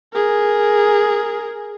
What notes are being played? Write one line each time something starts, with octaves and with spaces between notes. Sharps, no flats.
G#4 A#4